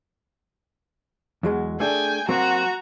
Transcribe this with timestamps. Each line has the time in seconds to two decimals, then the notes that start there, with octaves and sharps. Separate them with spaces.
1.43 E2 F#3 G#3
1.80 A3 D4 G#4 G5 G#5
2.29 F#3 A#3 C4 F#4 A#5